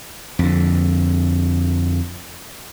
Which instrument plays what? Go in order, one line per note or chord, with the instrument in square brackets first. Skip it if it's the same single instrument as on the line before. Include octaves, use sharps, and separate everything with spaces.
[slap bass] F2 D3